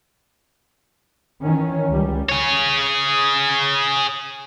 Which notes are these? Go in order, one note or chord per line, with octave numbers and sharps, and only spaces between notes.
D#3 E3 C#4
C#2 G3
G#4 C#5